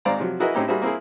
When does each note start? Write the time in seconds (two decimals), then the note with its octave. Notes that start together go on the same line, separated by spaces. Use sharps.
0.05 G#1 G#2 C5 D5 F5 A#5
0.19 C3 F3 F#3
0.40 E4 F#4 G#4 A#4 B4 D#5
0.55 A2 C4 C#4 D#4 E4 G4
0.68 G3 A#3 F#4 G#4 C5 E5
0.82 A#3 C4 E4 G#4